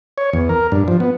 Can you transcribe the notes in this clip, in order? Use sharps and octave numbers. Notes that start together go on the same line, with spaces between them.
C#5
E2
A#4
G2
F3
B3